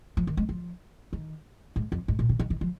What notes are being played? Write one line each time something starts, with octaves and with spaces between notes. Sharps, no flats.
F3
D#3
G#3
F3
D#3
G#2
F2
G#2
A#2
C#3
D#3
D#3
F3